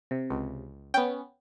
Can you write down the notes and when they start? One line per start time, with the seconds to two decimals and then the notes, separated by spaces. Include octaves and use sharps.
0.11 C3
0.30 C#2
0.94 B3 C#4 G5